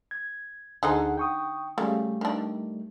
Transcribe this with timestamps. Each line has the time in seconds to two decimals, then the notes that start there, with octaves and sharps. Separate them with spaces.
0.11 G#6
0.83 D2 D3 D#4 G#4 C5 F#5
1.17 G5 C#6 D#6
1.78 C#3 G3 A3
2.21 D#3 D4